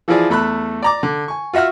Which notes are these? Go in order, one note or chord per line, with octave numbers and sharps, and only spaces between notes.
E3 F3 E4 F4 G#4 D5
E2 A3 B5 E6 F#6
D5 A#5 D6
D3
G#5 C#6
F4 F#4 E5 F#5 F6